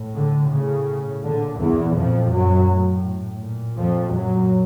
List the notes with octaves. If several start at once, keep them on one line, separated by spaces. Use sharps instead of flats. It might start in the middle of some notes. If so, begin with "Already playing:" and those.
Already playing: A2
D3
A2 C#3
A#2 D3
E2 E3
F2 A#2 F3
F#2 F#3
A2
A#2
F2 F3
F#2 A#2 F#3